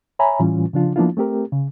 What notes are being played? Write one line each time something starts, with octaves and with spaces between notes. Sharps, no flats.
C#5 E5 G#5 A#5 B5
A2 E3 G3 C#4 F4
C#3 F3 D4 F4
F3 A#3 B3 D4 E4 F4
A3 C4 G4 A#4
C#3